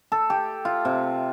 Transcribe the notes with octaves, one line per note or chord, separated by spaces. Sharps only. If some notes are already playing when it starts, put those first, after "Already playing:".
A4
G4
F4
C3